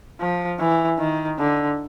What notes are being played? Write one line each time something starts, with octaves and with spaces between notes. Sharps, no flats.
F3
E3
D#3
D3